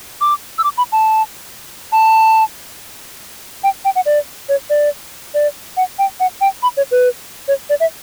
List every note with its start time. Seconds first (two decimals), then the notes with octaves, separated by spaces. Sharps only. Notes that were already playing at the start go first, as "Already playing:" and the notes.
0.21 D6
0.58 E6
0.64 D6
0.78 B5
0.92 A5
1.92 A5
3.64 G5
3.85 G5
3.96 F#5
4.06 D5
4.49 C#5
4.70 D5
5.34 D5
5.77 F#5
5.99 G5
6.20 F#5
6.41 G5
6.63 B5
6.77 C#5
6.91 B4
7.48 C#5
7.70 D5
7.80 E5